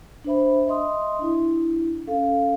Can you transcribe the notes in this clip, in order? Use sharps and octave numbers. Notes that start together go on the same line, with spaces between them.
D4 B4 C5 E5 B5
D#5 E5 C6 D#6
D4 E4
C#4 A4 F5